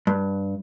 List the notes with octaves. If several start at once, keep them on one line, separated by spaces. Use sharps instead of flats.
G2